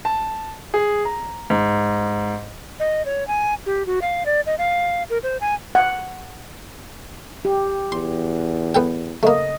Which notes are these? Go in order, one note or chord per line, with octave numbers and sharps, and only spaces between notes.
A5
G#4
A#5
G#2
D#5
C#5
G#5
G4
F#4
F5
D5
D#5
F5
A#4
C5
G#5
F#5
G4
E2 C6
B3 A4 G5
C#3 A3 A#3 D#5